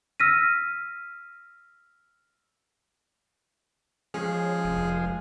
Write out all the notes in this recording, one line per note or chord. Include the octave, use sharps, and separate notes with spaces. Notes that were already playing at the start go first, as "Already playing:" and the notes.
E6 F6 A#6 B6 D#7
F3 G#3 C#4 G#4
F1